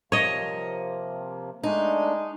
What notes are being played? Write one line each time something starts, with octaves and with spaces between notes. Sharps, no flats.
C3 F3 A#3 C#5 D#5
G#3 A3 D4 D#4